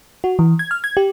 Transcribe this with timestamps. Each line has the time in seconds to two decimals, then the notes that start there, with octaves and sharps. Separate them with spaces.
0.24 F#4
0.39 E3
0.59 G#6
0.71 F6
0.84 G#6
0.97 G4